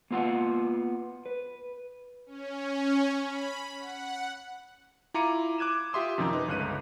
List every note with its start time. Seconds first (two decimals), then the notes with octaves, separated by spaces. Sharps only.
0.11 A#3 B3 F4 F#5
1.26 B4
2.26 C#4
3.20 B5
3.77 F#5
5.14 E4 F4 A#5 D6 C#7 D#7
5.58 D6 F#6 G#6 D#7 E7
5.93 F4 G4 E5 C6 D#6
6.18 F#2 C3 D#3 F3 D#4
6.33 D#4 B4
6.48 G1 C#2 F#6 D#7